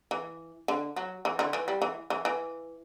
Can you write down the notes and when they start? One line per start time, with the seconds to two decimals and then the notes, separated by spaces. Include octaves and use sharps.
0.11 E3
0.68 D3
0.96 F#3
1.25 E3
1.39 D3
1.53 E3
1.68 G3
1.82 E3
2.10 E3
2.25 E3